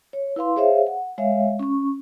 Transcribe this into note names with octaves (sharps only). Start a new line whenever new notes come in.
C#5
E4 B4 F5 C6
G#4 C5 C#5 E5 F5
F#5
G#3 C#5 E5 F5
C#4 C#6